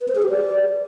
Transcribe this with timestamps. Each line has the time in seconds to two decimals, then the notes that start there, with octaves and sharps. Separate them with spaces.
0.01 B4
0.08 C5
0.15 G#4
0.22 G4
0.30 D5